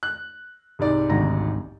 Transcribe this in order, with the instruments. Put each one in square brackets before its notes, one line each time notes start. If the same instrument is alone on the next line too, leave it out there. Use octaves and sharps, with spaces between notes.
[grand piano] F#6
C2 G#2 D5
[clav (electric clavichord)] G#1 D2 A#5